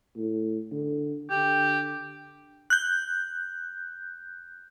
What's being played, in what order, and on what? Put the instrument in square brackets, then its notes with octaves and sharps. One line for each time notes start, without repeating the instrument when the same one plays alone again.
[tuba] A2
D3
[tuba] D3 [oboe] G4
[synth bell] F#6 G6